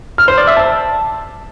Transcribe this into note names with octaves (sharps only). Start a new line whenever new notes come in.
F6
C5
D5
E5
A5